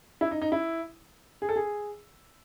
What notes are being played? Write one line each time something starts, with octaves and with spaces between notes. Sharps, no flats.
E4
D#4
D#4
E4
G#4
A4
G#4